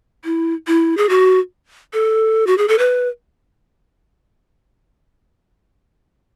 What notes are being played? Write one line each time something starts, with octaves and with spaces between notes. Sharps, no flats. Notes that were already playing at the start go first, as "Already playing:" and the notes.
E4
E4
G#4
F#4
A4
F#4
G#4
A4
B4